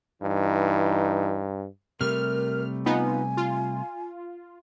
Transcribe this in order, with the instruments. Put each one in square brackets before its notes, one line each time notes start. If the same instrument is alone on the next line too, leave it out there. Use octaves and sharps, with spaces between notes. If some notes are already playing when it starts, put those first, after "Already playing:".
[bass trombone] G2 [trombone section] E3 D#4
[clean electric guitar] C3 G3 A3 [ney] A#4 [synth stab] F6
[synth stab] B3 D#4 F4 [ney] G#5
[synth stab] F4